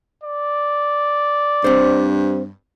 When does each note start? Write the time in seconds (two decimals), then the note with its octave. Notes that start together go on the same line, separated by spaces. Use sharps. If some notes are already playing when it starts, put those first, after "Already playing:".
0.24 D5
1.64 G2 C4 C5